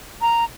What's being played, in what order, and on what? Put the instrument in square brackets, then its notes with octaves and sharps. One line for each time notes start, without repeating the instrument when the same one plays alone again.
[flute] A#5